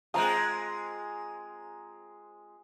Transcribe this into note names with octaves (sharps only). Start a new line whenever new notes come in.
G#3 C4 F4 A#5 D#6